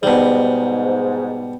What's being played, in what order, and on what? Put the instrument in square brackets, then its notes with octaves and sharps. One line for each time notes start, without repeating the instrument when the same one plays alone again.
[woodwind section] G#2 [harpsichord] B2 G3